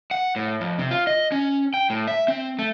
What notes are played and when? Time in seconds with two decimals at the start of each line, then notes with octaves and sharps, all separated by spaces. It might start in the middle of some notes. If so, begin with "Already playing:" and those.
0.11 F#5
0.36 A2
0.61 F2
0.78 C3
0.91 F4
1.07 D#5
1.32 C#4
1.74 G5
1.90 A2
2.07 E5
2.28 C4
2.59 A3